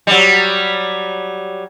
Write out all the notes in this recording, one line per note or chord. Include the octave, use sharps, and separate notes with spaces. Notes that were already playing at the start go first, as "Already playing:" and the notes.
F#3 G3